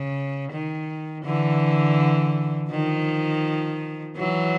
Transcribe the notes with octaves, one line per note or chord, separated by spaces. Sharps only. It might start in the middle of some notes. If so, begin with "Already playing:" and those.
Already playing: C#3
D#3
D3 E3
D#3 F3
E3 F#3